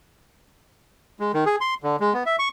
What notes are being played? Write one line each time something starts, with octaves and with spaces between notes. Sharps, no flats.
G#3
D#3
G#4
C6
D3
G#3
B3
E5
C#6